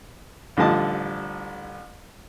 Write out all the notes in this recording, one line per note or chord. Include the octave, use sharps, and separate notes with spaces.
A1 D3 F3 G3 D#5 A5